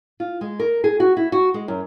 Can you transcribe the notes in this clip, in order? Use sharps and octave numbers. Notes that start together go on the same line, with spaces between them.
F4
G#3
A#4
G#4
F#4
E4
F#4
G#3
F#2